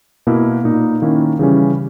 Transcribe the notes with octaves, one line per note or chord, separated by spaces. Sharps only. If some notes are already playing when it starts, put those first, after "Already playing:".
B2 A#3 E4
A#2 A#3 D#4
D#3 A#3 C#4 E4
C#3 E3 G3 C#4